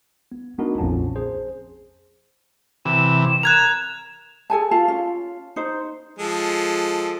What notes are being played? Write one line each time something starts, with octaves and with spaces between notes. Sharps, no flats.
B3
A3 B3 D4 D#4 F#4 A#4
A#1 F2 A#2 C#4 A5
G#4 C5
C3 E3 E7
A#4 F#6 G#6 F7
G#4 A4 G#5 A5
F4 F5 A5
C#4 F4
D#4 C5
F3 G#3 A4